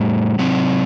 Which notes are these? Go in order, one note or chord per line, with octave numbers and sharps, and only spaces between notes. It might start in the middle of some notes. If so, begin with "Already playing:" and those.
Already playing: A2 G3
C3 F#3 C4